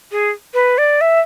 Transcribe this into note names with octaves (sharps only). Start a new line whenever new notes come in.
G#4
B4
D5
E5